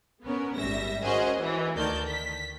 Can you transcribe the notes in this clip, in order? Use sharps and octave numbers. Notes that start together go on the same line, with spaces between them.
B3 C#4 A#4
G#1 G3 E5 A#6
C#4 F#4 G#4 A#4 C5 D#5
E3
D2 D#3 D5 A5 G6
B6